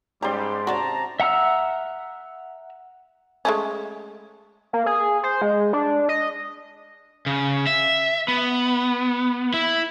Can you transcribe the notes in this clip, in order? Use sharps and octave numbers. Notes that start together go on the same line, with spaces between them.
G#2 G3 C#4 G4 D5 A#5 C6
C3 C#4 D4 F#4 A5 A#5
E5 F#5 A#5 E6 F6
G#3 A3 C#4
A#3
G#4
C5
G#3
D4
D#5
C#3
E5
B3
E4